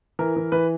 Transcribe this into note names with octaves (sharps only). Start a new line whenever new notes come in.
E3 A#4
E3
E3 B4